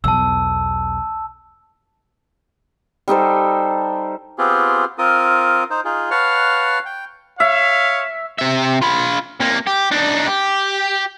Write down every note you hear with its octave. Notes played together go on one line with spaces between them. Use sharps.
B1 E2 A5 E6
G3 D#4 A4 C5
B3 C4 F4 G4 G#4
C4 F4 A#4 D#6
D#4 C5
D#4 F4 G#4
B4 C#5 F5 F#5 A5 F6
G5
C#5 E5 F5
C3 E5
F4 B5
C3 A#3
G4
D4 D#4
G4